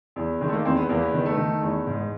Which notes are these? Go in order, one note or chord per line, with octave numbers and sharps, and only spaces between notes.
E2
D#3 G#3
A3
A#3
E2 C4
B3
E2 A#3
B3
D#3 B3
A3
D#3
E2
G#2